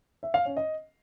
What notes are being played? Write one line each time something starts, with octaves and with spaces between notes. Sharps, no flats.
E5
F5
C#4
D#5